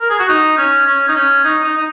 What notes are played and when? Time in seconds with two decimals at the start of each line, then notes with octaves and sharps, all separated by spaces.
0.01 A#4
0.10 G#4
0.19 F#4
0.29 D#4
0.58 C#4
0.87 C#4
1.08 D#4
1.15 C#4
1.45 D#4
1.64 D#4
1.77 D#4